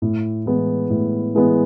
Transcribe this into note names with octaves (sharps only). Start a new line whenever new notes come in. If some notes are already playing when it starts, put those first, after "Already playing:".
A2
E3 G#3 B3
A2
E3 G#3 B3